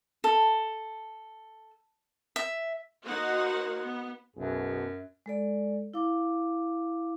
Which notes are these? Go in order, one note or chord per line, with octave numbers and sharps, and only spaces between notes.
A4
E5
A#3 D#4 F#4 C5 F#5
B3
B1 F#2 B2 G#4
G#3 A4 D5
E4 F5 D6